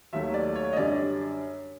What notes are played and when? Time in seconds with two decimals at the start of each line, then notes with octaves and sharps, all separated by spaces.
0.13 D#2 D#3 F#3 A3 E5
0.34 D5
0.55 C#5
0.73 D#5
0.76 F#2 D3 G3 D5